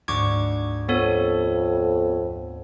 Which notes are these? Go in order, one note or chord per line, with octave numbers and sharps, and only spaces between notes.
D2 G#2 C#6 D6 G#6
F2 B3 A4 C#5 F5